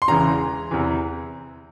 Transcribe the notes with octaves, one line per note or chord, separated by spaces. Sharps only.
C6
E1 E2 C#3 E3 A#5
E2 C3 E3